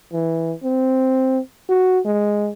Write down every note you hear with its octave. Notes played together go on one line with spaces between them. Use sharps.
E3
C4
F#4
G#3